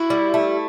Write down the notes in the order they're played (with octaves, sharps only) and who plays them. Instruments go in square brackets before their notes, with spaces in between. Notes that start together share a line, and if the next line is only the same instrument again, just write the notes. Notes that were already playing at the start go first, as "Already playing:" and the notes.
Already playing: [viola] E4 [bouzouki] F#4
[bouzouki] G3
A3